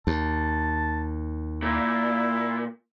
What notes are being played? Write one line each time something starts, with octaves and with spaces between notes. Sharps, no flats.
D#2 A5
A#2 E4